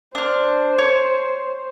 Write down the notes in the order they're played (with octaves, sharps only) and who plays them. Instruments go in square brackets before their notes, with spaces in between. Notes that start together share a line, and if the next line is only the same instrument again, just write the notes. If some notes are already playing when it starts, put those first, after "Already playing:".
[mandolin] D4 F6 [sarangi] C5
[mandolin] C#5